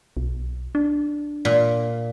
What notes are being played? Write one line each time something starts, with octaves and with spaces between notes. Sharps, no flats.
B1
D4
A#2